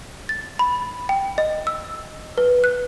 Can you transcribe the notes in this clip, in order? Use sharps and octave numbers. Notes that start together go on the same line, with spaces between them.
A6
B5
G5
D#5
E6
B4
F#6